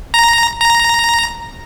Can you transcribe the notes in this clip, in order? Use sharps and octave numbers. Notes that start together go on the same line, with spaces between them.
A#5
A#5